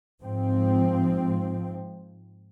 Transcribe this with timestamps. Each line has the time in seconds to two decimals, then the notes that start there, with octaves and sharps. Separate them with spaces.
0.22 G#2 F3 C4